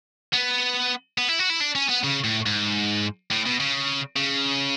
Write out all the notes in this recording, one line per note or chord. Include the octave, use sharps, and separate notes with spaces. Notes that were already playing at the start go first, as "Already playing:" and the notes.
B3
B3
E4
F#4
E4
D4
C#4
B3
C#3
A2
G#2
A2
B2
C#3
C#3